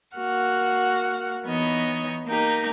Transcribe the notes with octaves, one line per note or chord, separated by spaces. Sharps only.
A#3 F#4 F#5 F6
E3 B3 D#4 C#5 D#5
A#3 D#4 G4